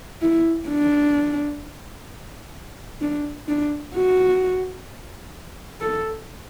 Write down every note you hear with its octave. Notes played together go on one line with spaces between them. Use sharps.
E4
D4
D4
D4
F#4
A4